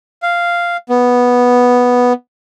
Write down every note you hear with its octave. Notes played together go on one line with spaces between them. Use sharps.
F5
B3